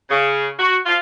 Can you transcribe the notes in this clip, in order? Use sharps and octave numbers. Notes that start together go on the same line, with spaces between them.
C#3
F#4
F4